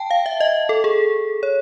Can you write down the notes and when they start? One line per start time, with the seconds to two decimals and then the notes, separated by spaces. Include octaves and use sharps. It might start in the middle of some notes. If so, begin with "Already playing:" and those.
Already playing: G5 A5
0.11 F5
0.26 E5
0.40 D#5
0.69 A4
0.84 G#4
1.43 C#5